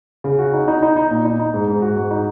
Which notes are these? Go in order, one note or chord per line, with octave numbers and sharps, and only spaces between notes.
C#3
F#4
D#4
D#4
D#4
D#4
A#2
D#4
D#4
G#2
G#2
F#4
G#2
D#4